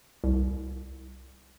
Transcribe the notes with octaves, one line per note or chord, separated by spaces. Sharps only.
C2